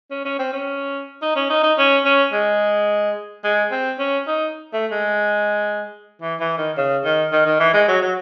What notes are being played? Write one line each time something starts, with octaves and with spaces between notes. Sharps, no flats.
C#4
C#4
C4
C#4
D#4
C#4
D#4
D#4
C#4
C#4
G#3
G#3
C4
C#4
D#4
A3
G#3
E3
E3
D#3
C#3
D#3
D#3
D#3
E3
G#3
F#3
F#3